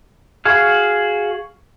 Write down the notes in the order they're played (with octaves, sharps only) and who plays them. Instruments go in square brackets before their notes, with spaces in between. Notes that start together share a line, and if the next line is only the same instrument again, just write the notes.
[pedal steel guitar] F#4 G#4 F5